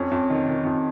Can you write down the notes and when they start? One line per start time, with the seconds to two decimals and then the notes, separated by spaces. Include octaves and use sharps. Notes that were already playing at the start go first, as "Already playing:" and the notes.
Already playing: F2 C#4
0.11 F2
0.30 D#3
0.47 D#3
0.65 F2